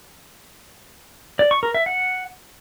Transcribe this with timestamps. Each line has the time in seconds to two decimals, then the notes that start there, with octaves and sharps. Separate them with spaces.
1.39 D5
1.51 C#6
1.63 A#4
1.75 E5
1.86 F#5